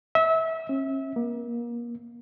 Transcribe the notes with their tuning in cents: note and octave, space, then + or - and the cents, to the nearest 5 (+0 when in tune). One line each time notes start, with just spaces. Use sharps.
E5 -25
C#4 -40
A#3 +30